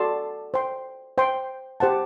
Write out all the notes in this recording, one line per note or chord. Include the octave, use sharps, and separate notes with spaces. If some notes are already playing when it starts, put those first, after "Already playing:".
Already playing: F#4 A4 D5 A5 C6
C5 G5 C6
C5 G5 C6
G4 C5 F#5 A5